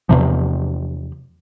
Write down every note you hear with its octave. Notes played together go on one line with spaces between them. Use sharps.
E2 C3 F3